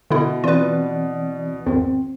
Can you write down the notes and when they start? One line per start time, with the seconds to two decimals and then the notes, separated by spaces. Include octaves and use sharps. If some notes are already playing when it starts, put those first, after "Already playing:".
0.11 B2 D3 E4
0.44 E3 C4 F4 B4 D5
1.66 G#1 E2 C4